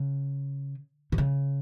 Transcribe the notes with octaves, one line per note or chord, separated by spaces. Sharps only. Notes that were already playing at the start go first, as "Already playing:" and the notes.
Already playing: C#3
C3
C#3